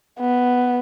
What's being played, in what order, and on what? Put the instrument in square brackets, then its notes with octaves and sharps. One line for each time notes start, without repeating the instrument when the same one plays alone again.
[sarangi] B3